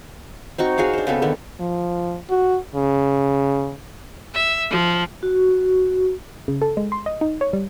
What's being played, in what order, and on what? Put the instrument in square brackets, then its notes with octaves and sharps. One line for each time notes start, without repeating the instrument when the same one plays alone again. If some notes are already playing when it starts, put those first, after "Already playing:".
[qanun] C4 D#4 F#4 C#6
F#4 G#4 C#5 F5
D4 C5
C#3 B3 C4 A4
D3 D#3 B3
[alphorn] F3
F#4
C#3
[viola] E5
F3
[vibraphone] F#4
[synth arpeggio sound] C#3
A4
G#3
C6
D#5
D#4
C#5
G3